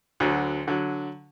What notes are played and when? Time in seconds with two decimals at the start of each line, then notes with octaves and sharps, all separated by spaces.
0.20 D2 D3 F#3
0.68 D3 F#3